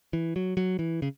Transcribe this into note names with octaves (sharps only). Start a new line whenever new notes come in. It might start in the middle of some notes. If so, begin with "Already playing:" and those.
E3
F#3
F#3
E3
C#3